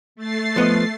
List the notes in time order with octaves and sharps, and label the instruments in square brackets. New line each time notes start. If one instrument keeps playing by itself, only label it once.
[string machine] A3 A6 C7
[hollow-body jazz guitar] F3 B3 D#5